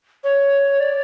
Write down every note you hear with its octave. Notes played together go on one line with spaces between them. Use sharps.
C#5
D5